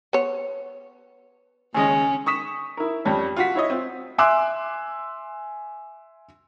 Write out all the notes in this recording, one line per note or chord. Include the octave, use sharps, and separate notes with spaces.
B3 C#5
D#2 C#3 G#3 C#4 D#5 G#5
C#6 D#6 B6 E7
E4 A#4
F2 G3 C#4
F4 F#4 B6
E4 C#5 D#5
C4 F4
E5 G#5 C6 D6 E6 F#6